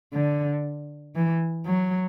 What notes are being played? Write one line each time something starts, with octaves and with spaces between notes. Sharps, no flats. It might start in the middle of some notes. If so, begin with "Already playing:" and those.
D3
E3
F#3